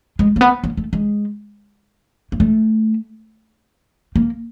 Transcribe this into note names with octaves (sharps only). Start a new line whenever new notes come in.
G#3
A#3
B3
A#3
A3
G#3
A#3
A3
A#3